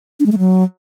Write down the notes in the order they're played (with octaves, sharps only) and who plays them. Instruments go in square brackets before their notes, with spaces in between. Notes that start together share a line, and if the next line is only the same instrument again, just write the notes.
[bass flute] D4
G#3
A3
F#3